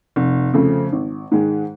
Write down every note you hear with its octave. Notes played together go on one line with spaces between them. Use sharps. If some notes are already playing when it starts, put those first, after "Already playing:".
F1
F2 C#3 F3 A3
G#1
G#2 D#3 G#3